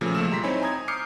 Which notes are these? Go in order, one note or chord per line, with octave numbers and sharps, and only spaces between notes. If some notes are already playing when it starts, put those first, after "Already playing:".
A#2 C#3 F3 A3
B1 F3 A3 E6 E7
G3 A#5 C6 B6
C4 D#4 E4 C#5 G#5 B5
G#5 A#5 D#6 G#6
D6 D#6 F6 G6 C7 C#7